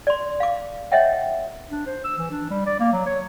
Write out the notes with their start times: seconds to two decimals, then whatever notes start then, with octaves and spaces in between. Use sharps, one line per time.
0.07 D5 C6
0.40 F5 D6
0.92 C#5 D#5 E5 F#5 G5
1.71 D4
1.87 C5
2.04 E6
2.18 E3
2.31 D4
2.50 G3
2.67 D5
2.80 A#3
2.93 F#3
3.06 C#5